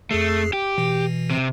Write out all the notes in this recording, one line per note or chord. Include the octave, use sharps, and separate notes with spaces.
F2 A3 G#4 C7
G4
B2 E3
C3